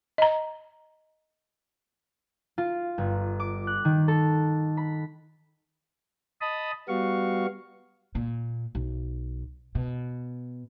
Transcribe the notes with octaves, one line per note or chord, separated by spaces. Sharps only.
D#5 A#5
F4
G1
D6
F#6
D#3
A4
B5
D#5 A5 B5 D#6
G3 B3 F#4 F5 C#6
A#2
B1
B2